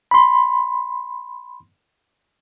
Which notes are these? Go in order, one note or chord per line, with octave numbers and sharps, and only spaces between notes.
B5 C6